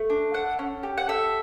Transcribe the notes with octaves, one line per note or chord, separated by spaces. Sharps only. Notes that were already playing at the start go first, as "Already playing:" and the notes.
Already playing: A3
D4
A4 F#5
C#4
G4
F#5
A4 E5